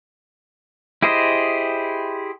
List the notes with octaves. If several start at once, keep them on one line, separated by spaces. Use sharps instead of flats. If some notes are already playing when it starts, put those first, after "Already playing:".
E4 G4 G#4 C5 D#5